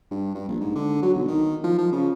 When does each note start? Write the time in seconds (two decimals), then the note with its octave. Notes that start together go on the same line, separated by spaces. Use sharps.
0.11 G2
0.35 G2
0.48 A#1
0.61 G#2
0.75 D3
1.02 F#3
1.14 B1
1.28 D#3
1.64 F3
1.78 F3
1.92 C#3